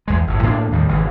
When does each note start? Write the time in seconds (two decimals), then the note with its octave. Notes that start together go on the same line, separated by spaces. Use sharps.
0.08 E2 G#3
0.27 G1 A2
0.43 A2 A#3 D4
0.71 D#2 A2 D#3 G3
0.89 G#1 C#3 E3